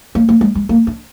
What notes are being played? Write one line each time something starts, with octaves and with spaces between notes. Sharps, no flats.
A#3
A#3
G#3
G#3
A#3
D4